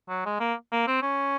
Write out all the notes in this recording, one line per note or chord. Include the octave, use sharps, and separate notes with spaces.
F#3
G#3
A#3
A#3
C4
C#4